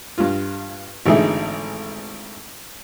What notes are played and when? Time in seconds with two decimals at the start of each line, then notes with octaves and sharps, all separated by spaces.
0.18 G2 F4
1.06 G#1 D3 E3 A3 D#4 G#4